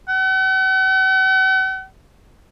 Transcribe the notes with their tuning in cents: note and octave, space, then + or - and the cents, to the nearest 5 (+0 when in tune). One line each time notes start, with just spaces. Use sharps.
F#5 +45